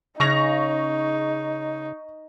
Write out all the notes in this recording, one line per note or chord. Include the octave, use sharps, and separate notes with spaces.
C#3 D#4 C#6 A#6 F7